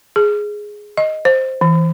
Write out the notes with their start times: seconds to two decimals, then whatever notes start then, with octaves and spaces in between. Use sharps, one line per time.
0.16 G#4
0.97 D#5
1.25 C5
1.61 E3